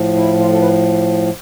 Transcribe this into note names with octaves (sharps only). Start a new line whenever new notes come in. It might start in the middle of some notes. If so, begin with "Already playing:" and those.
Already playing: A2 F3
E4
F4
A4
B4